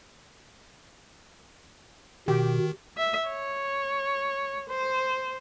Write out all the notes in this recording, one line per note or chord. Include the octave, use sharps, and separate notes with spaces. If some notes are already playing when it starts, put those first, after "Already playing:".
B2 D#3 G4
E5
C#5
C5